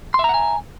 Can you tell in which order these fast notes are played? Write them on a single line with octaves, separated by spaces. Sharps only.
C6 E5 A#5 F#5 G#5